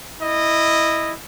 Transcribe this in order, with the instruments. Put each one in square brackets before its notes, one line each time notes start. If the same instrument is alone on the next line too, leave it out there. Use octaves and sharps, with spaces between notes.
[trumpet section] E4 D#5